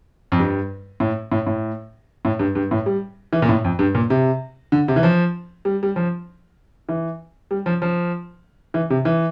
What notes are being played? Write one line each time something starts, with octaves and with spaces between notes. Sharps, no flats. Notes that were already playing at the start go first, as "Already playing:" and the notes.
F2
G2
A2
A2
A2
A2
G2
G2
A2
G3
E3
A#2
A2
F2
G2
A#2
C3
D3
C3
E3
F3
G3
G3
F3
E3
G3
F3
F3
E3
C3
E3